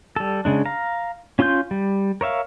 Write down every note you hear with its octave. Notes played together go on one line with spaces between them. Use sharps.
G3 A4
C#3 G#3 D4
F5 A#5
C#4 F4 C6 D#6 G6
G3
A#4 C#5 E5 F5